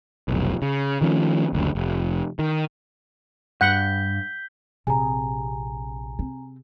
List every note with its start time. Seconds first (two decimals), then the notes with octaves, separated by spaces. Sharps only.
0.28 F1 B1
0.62 C#3
1.01 D#3 F3 A3 C#4
1.53 F#1 D2
1.75 F1
2.39 D#3
3.61 G2 F#5 G6 B6 G7
4.87 A#1 C3 G#4 G#5 A#5
6.19 C4